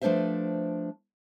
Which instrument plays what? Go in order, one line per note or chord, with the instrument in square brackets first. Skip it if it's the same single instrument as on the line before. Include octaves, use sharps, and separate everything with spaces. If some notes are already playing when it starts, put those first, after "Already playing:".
[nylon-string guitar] F3 A3 D4 B4 C5 E5